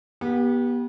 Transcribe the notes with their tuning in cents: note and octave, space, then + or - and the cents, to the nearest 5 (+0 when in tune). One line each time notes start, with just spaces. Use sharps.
B3 -30 G4 +0